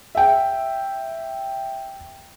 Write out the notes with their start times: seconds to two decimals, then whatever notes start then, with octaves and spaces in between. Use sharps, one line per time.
0.15 E5 G5